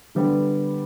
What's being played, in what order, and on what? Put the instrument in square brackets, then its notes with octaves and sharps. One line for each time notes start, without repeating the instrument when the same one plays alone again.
[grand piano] D3 G3 B3